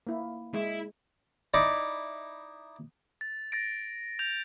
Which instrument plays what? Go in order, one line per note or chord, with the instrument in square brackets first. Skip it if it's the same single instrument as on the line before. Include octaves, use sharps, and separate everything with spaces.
[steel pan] A#3 E4
[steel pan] G#3 [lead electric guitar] E4
[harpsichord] D#4 E4 D5
[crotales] A6
A6 A#6 D7
G6 F7